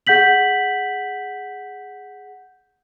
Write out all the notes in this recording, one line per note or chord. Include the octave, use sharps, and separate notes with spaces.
G#4 F#5 G6 B6 F#7